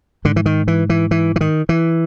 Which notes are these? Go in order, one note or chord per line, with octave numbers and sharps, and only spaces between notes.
G#2 D3
E3
D#3
E3
E3
E3
E3
D#3
E3